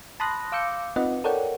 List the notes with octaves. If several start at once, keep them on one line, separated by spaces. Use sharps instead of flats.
A5 B5 C6 D#6 F#6 A#6
F5 D6 E6 G6 C#7
C4 D#4 F4 B4 D#5 F#5
A4 A#4 C#5 D5 F#5 G5